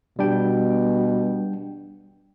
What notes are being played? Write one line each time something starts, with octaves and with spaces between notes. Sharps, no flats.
B2 G3 D4 G5